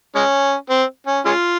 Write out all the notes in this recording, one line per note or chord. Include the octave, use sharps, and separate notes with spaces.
G#3 C#4
C4
C#4
G#3 C#4 F4